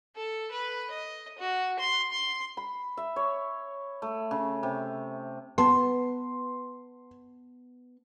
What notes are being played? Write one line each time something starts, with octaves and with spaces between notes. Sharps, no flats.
A4
B4
D#5
F#4
C6
C6
B5
E5
C#5
A3
C#3
C3
B3 A5 C6